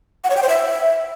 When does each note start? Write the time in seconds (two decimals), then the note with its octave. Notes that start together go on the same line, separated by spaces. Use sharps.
0.24 F#5
0.30 C#5
0.36 G5
0.43 C5
0.49 E5